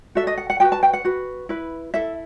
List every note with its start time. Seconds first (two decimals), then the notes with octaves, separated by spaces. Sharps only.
0.15 F#4 A4 E5
0.27 D#5
0.37 F#5
0.50 F#5
0.60 F#4 B4 G5
0.72 A5
0.83 G5
0.93 F#5
1.05 F#4 B4
1.49 E4 B4
1.94 E4 A4 E5